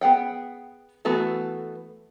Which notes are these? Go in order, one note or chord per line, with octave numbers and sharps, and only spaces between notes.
B3 G#4 F#5 G5
E3 A3 B3 F#4 A4